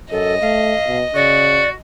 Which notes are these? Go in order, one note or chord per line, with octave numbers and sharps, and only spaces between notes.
F#2 A4 D#5
A3 F5
B2
C#3 F#4 D5